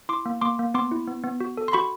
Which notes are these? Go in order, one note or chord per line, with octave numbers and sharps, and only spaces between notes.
E4 C6 D6
A#3
A#3 C6 D6
A#3
B3 C6 D6
E4
B3
B3
F#4
A4
C6
F#4 B5 C#6